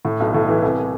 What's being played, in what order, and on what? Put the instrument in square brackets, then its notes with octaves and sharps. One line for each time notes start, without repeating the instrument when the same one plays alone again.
[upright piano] A2
B1
A2
E3
C2